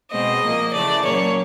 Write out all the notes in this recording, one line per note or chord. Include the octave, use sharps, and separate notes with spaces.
B2 G#3 C4 D#5
A#2 F3 A#3
C#3 E3 A3 D5
A#2 F#3 A#3 C#4 C#5